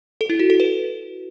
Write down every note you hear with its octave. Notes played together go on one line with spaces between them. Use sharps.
A4
E4
F#4
A4
B4